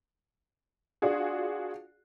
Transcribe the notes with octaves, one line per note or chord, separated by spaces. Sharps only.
D4 F4 F#4 G#4